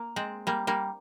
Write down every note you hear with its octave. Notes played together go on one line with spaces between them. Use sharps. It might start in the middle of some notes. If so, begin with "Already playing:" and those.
Already playing: A#3
G#3 C4
G3 A#3
G3 A#3